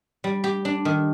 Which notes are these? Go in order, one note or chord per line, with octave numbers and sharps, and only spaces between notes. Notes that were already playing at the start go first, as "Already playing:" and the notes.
G3
G4
D4
D#3